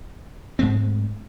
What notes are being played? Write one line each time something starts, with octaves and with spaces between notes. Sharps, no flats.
G#2 G#3 A3 C4